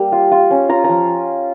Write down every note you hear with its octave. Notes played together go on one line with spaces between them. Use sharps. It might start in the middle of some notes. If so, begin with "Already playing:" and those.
Already playing: G3 A#3
F4
F4
C#4
F4 A#5
F3 A#5